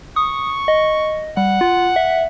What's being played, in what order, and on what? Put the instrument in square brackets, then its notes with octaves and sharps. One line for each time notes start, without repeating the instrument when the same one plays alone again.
[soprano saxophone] C#6 [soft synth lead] D#6
[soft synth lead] D#5
[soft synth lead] G3 [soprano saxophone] F#5
[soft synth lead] F4
E5